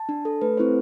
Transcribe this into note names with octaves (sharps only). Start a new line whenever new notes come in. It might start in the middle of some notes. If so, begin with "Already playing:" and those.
Already playing: A5
D4
A4
A3 B4
C4 E4 A4 C5